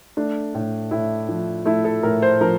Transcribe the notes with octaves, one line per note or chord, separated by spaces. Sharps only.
A3 D4
A2
A2 E4
F3
A3 E4
A4
A2 A#4
C5
F3 A#4